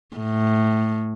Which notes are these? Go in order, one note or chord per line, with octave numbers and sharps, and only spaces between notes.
A2